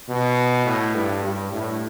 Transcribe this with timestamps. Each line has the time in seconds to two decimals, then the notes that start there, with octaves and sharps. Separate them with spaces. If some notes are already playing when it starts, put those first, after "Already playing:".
0.09 B2
0.65 A2
0.95 G2
1.24 G2
1.52 A2